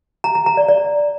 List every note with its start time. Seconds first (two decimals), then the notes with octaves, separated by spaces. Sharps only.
0.24 A#5
0.35 A#5
0.46 A#5
0.57 D5
0.68 D5